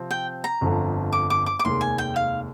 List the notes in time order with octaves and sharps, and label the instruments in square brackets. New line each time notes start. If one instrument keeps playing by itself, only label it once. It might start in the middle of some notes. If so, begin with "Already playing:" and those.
Already playing: [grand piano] C3 F3 C4
[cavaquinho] G5
A#5
[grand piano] G1 F2 D3 F3
[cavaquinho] D6
D6
D6
D6
[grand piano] F1 D#2 D#3 G#3 [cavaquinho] C6
[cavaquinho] G#5
G5
F5